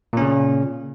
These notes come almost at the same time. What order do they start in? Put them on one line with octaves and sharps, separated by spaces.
A#2 C#4 C#3